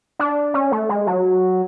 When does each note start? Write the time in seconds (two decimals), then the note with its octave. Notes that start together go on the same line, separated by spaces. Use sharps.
0.19 D4
0.54 C#4
0.72 A3
0.89 G#3
1.07 F#3